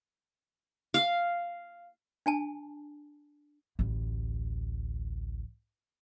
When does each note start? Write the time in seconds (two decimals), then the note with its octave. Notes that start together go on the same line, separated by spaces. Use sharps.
0.94 F5
2.26 D4 G#5 A5
3.79 A1 D2